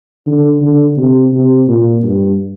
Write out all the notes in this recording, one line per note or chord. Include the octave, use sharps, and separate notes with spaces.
D3
D3
C3
C3
A#2
G2